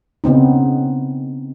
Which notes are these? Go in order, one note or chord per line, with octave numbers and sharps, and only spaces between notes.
C#3 B3 C4 D#4